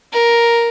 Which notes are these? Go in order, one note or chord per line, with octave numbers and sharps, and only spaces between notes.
A#4